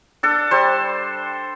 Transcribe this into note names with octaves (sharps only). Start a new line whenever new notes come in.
D4 A4
G3 C5